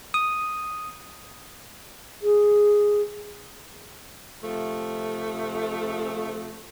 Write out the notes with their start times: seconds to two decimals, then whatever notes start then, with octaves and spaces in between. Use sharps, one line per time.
0.14 D#6
2.22 G#4
4.42 C3 F3 A3